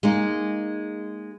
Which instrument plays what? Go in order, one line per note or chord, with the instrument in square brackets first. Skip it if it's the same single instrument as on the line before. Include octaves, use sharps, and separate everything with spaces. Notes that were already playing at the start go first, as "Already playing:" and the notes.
[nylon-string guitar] G#3 A#3 D#4